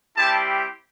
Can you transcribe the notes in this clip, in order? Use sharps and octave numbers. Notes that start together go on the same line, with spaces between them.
G3 C4 E4 G4 A5